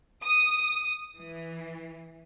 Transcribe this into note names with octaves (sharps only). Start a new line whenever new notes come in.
D#6
E3